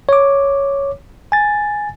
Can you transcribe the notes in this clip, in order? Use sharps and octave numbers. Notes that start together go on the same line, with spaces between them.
C#5 D6
G#5 A6